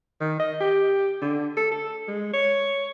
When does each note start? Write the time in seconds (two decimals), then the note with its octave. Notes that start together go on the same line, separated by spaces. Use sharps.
0.21 D#3
0.40 D#5
0.61 G4
1.22 D3
1.57 A4
1.71 A4
2.08 G#3
2.33 C#5